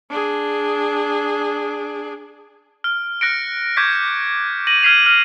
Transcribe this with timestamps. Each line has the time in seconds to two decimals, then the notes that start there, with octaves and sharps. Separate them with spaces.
0.10 D4 G#4
2.84 F6
3.21 F6 F#6 A#6 C#7 D7
3.77 C#6 D6 G6 G#6 A#6 B6
4.67 A#6 D#7 F#7
4.83 F6 G#6 B6 C7 D#7 F7
5.06 F6 D#7